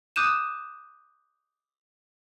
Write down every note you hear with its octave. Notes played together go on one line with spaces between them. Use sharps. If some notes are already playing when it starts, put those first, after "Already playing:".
D6 D#6 F#6 G6 D#7 E7